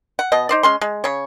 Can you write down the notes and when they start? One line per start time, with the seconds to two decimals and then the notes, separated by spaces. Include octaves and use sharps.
0.19 F#5
0.32 B2 D#5
0.49 D#4 C5 D5
0.63 G#3 C#4 C6
0.81 G#3
1.04 C#3 C#5